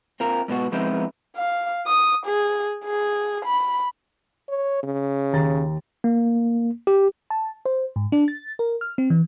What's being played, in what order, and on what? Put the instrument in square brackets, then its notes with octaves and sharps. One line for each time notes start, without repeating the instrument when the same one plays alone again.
[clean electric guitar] C4 F4 A#4
G#2 B2 B3 F#4
F3 G#3 B3 C4 D#4 E4
[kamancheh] F5
D#6
G#4
G#4
B5
[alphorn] C#5
C#3
[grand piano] D#2 A#5 A6
[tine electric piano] A#3
G4
[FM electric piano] A5
C5
G#2
D4
A6
A#4
F6
C4
E3